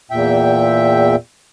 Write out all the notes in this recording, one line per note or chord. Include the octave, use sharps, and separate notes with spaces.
E2 A#2 E5 G5